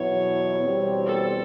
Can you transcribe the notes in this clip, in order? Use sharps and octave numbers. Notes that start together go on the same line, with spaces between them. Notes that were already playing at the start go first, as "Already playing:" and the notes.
Already playing: E2 B2 F#3 B3 E4 C#5
E2 B2 G3 C4
A4